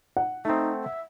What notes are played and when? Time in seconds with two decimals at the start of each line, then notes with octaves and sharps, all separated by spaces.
0.17 F#5
0.45 A3 C4 D#4
0.82 E5